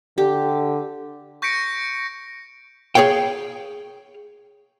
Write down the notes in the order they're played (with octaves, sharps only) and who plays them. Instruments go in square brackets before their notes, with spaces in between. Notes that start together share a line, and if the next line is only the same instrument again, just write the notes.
[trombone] D3 [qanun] G4
[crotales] C#6 G6 A#6 B6 C#7 D7
[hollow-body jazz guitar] G#4 A#4 C#5 F5 G5